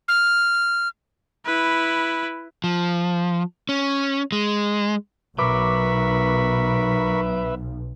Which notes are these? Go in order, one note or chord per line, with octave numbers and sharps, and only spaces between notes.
F6
E4 B4
F3
C#4
G#3
B1 F#3 A#4 B4 E5 B5 C#6 D6